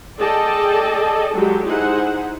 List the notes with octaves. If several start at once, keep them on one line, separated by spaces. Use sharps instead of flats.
G#4 A4 D5 D#5 G5 A5
F#3 G#3 G4 A4
D#4 E4 G#4 C5 F#5